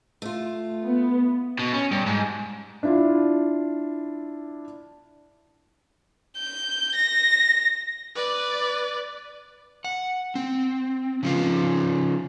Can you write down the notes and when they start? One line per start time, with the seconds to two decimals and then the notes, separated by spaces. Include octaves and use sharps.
0.22 A3 F4
0.82 B3
1.59 B2
1.73 C#4
1.91 G2
2.06 G#2
2.83 D4 E4 F4
6.38 G6
6.95 A#6
8.15 B4 D5
9.84 F#5
10.35 C4
11.23 C#3 F3 F4